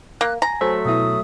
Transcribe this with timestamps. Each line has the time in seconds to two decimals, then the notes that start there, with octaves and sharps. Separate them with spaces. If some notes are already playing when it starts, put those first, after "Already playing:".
0.21 A#3 F#6
0.42 G#5 A#5
0.61 F#3 A3 C5 E5
0.85 B2 B3 E4 D#6